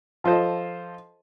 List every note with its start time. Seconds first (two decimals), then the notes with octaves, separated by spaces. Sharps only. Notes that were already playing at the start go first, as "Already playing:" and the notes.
0.24 F3 F4 A4 C5 D#5